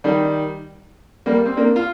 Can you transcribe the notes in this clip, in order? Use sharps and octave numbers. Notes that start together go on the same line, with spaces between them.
D#3 G3
G3 A#3
C4
A#3 D4
F4